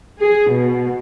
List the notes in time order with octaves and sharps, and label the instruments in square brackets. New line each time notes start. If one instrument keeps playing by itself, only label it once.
[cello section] G#4
B2